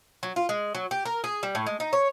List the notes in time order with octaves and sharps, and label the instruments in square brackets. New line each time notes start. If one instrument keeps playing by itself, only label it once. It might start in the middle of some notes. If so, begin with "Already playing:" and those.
[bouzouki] F#3
F4
G#3
F#3
G4
A#4
G#4
G3
A2
G#3
D#4
C#5